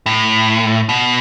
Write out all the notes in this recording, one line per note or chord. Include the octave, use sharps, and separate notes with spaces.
A2
B2